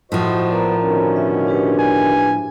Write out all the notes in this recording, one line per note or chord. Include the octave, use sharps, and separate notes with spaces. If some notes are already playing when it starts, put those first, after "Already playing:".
A2 F3 F#4 C5 D#5
B3 A#4 C5 D5 A#5
B2 D3 D#3 C#4
E5
D4 G4 B4
G#5